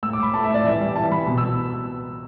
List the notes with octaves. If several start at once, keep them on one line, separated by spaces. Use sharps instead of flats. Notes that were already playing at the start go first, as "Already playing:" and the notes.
A2 E6
D6
A2 B5
A3 A5
E5
A2
D5
E3 E5
G3
E3 A5
E3 B5
B2
E6